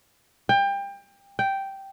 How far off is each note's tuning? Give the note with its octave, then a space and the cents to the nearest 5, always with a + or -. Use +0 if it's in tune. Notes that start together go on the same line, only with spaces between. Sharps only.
G5 +25
G5 -5